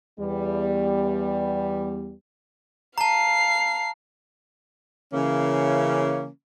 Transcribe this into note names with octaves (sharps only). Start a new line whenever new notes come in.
E2 G3 B3
F5 A5 A#5 C7
C#3 E3 A#3 C#4